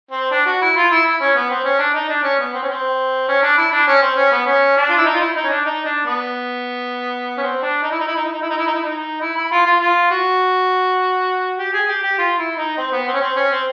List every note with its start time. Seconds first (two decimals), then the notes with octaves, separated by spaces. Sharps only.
0.11 C4
0.32 D4
0.46 F#4
0.62 E4
0.76 F4
0.91 E4
1.06 E4
1.21 C#4
1.35 B3
1.50 C4
1.64 C#4
1.79 D4
1.94 D#4
2.09 D4
2.24 C#4
2.39 B3
2.54 C4
2.63 C#4
2.69 C4
3.29 C#4
3.43 D4
3.57 E4
3.72 D4
3.88 C#4
4.02 C4
4.16 C#4
4.32 B3
4.46 C#4
4.77 D4
4.89 F4
4.98 E4
5.05 D#4
5.13 F4
5.21 E4
5.36 D#4
5.44 C#4
5.50 D4
5.66 D#4
5.85 D4
6.05 B3
7.38 C#4
7.43 C4
7.62 D4
7.82 D#4
7.92 E4
7.99 D#4
8.07 E4
8.16 D#4
8.25 E4
8.33 D#4
8.42 E4
8.49 D#4
8.58 E4
8.67 D#4
8.74 E4
8.83 D#4
9.21 E4
9.36 E4
9.51 F4
9.65 F4
9.80 F4
10.11 F#4
11.58 G4
11.73 G#4
11.88 G4
12.03 G4
12.18 F4
12.38 E4
12.57 D#4
12.77 C4
12.92 B3
13.07 C4
13.14 C#4
13.21 C4
13.36 C#4
13.51 C4